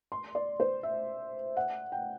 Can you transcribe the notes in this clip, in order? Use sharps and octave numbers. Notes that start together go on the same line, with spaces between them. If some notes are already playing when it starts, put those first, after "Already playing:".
C6
D5
C5
E5
F#5
G5